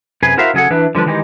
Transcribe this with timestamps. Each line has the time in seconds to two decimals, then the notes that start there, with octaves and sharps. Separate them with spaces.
0.23 F#2 C3 G#4 B4
0.37 E4 F#4 A#4 C5 E5 F5
0.54 C#3 F#3 G#4 A4 F#5
0.70 E3 D4 E4 B4
0.95 D3 F3 G3 B4
1.06 D#3 E3 G#3 D#4 G4